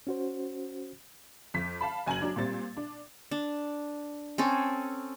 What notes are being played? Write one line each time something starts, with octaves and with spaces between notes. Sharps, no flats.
C#4 F#4 C5
F2 B6
F5 A5 B5
F#1 G#5 A#5 G#6 F#7
F#3 D4
A#2 G3 C4 A6
D4
D4
C4 C#4 A4